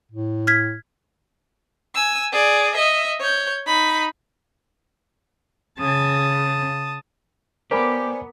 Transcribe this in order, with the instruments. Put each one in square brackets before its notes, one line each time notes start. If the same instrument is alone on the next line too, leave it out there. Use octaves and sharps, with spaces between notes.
[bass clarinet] A2
[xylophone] F6 G#6 B6
[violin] G#5 E6
G#4 D5
D#5 E5
C#5 G6
D#4 B5
[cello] C#3 [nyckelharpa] A5 D#6
[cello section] B3 [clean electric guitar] G4 [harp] A#4 B5 D6 [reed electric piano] C5 D5 G#5